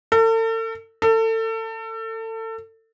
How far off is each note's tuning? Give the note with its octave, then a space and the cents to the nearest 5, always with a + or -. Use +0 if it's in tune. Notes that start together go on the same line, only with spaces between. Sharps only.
A4 +40
A4 +30